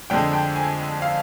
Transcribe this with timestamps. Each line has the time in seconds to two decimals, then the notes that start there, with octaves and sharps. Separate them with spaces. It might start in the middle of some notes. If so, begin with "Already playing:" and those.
0.10 F2 D3 G#3 G5
0.33 G5
0.56 G#5
1.02 F5